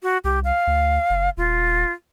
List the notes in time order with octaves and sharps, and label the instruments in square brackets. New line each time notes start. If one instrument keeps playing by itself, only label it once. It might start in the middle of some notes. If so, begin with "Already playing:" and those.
[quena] F#4
[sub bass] C2 [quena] G4
[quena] F5
[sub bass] D2
F#1
[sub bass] D#1 [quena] F4